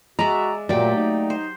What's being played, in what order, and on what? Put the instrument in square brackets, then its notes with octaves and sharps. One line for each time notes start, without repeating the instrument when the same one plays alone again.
[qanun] G#3 D5 E5 [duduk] F#4 [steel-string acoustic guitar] A#5
[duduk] A#2 [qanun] F#3 G4 [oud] A3 A#3 [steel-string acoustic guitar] D5 G5
[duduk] D#4
[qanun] C5